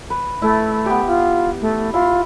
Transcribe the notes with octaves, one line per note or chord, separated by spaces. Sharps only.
B4
A3 E4
B3 G4
F4
A3
E4 F4 C6